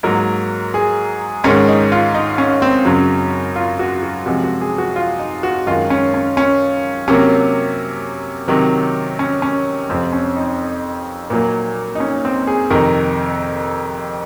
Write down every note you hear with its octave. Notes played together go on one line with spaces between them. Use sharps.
G#2 F#3 A#3 A#4
G#4
G#2 D#3 G#3 C#4
D#4
F4
D#4
C#4
C4
F#2 C#3 F#3
F4
F#4
F#4
C3 F3 G#3 F#4
F#4
G#4
F#4
F4
D#4
F#4
F#2 D#3 G#3 F4
C#4
C#4
C#4
C3 F#3 A#3 C#4
C3 D#3 F#3
C#4
C#4
F2 C3 F3 C4
C#4
D#4
A#2 F#3 A#3
D#4
C#4
C4
G#4
F2 C3 D#3 A#4